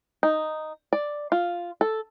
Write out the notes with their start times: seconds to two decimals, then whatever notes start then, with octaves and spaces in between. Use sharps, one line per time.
0.23 D#4
0.93 D5
1.32 F4
1.81 A4